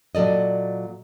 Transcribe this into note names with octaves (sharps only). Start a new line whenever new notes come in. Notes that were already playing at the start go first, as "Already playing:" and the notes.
A#2 F#3 A4 D5 D#5